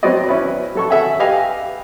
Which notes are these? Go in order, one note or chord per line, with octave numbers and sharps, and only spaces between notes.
F#3 B3 C4 F#4 D5 D#5
C#4 E4 B4
F#3 A4 C#6
A4 E5 F#5 G#5
G4 B4 D#5 F5 G#5